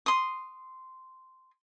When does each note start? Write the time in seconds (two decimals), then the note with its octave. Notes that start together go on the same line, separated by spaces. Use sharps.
0.06 C6 D#6